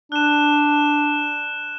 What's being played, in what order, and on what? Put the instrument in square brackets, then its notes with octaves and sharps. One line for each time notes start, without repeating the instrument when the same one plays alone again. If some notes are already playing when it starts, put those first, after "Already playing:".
[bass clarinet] D4 [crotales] F#6 E7